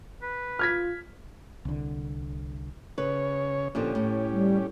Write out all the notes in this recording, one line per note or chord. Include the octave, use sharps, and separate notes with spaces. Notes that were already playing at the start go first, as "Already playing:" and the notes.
B4
F4 F6 G#6 B6
C2 D3
C#3 B4 C#5
A#2 D3 F3 C#4 G4
A2
G3